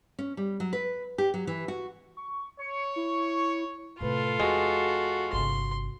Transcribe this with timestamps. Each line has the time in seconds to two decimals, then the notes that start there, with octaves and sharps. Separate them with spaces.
0.19 C#4
0.37 G3
0.60 F#3
0.73 B4
1.18 G4
1.34 F#3
1.47 E3
1.68 F#4
2.17 C#6
2.60 C#5 C#6 C#7
2.96 E4
4.01 A2 C3 F4 A4 B4
4.40 E2 G#3 F#4
5.33 G1 C3 C6